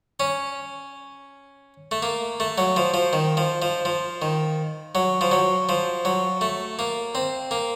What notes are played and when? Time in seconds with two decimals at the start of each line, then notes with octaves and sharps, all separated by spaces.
0.20 C#4
1.91 A3
2.02 A#3
2.40 A3
2.58 F#3
2.76 F3
2.94 F3
3.13 D#3
3.37 F3
3.62 F3
3.85 F3
4.22 D#3
4.95 F#3
5.21 F3
5.31 F#3
5.69 F3
6.05 F#3
6.41 A3
6.79 A#3
7.15 C4
7.51 A#3